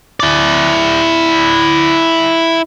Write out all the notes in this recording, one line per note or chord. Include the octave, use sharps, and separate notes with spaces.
E4 D5